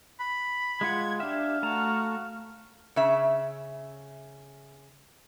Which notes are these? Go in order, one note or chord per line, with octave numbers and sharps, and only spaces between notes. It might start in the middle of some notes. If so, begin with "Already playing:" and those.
B5
G#3 F4 F#5 G#6
D4 G4 E5 F5
A3 F#4 A5 A#5
C#3 E5